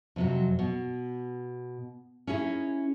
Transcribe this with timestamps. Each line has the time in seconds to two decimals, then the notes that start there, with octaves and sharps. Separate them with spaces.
0.16 F2 C3 F#3
0.59 B2
2.27 C#4 D#4 E4 G#4